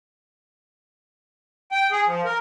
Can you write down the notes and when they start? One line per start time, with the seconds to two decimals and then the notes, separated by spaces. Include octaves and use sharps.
1.72 G5
1.92 G#4
2.07 F3
2.25 A#4